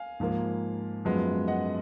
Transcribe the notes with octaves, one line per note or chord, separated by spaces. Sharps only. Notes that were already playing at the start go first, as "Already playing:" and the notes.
Already playing: F5 G#5
G#2 F3 A#3
F#2 F3 G#3 B3
D#5 F#5